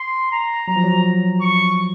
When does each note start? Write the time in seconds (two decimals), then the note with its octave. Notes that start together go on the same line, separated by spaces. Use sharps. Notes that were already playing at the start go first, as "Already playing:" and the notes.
Already playing: C6
0.31 A#5
0.68 F#3 A#5
0.76 F3
0.84 F#3
1.41 C#6